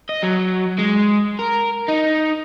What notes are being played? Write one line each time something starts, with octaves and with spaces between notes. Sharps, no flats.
D#5
F#3
G#3
A#4
D#4